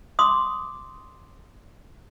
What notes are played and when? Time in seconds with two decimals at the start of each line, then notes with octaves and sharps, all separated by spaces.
0.19 C6 D6 D#6